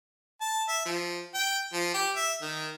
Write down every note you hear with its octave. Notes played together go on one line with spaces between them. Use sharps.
A5
E5
F3
G5
F3
G4
E5
D#3